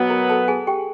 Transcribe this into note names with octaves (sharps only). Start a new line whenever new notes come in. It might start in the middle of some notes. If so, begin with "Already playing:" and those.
Already playing: B2 F#3 B3
A#4 A#5
A4 A5
G#4 G#5
G4 G5